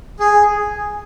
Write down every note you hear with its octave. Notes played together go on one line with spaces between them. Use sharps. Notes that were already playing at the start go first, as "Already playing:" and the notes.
G#4